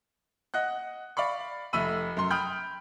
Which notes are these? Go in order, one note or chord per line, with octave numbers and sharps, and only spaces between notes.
D#5 F#5 F#6
D5 F5 B5 C#6
F1 A3 E5 B5 E6 D#7
F#2 C6
G5 B5 D#6 F6 G6